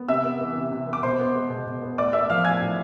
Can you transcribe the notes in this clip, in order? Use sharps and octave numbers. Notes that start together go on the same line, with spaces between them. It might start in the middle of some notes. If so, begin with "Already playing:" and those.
Already playing: B3
C3 E5 E6
B3
E3
C3
C3
B3
D6
B2 C5 C6
B3
G#3
B2
B2
B3
A2 D5 D6
B3 E5 E6
F3 F5 F6
A2 G#5 G#6
A2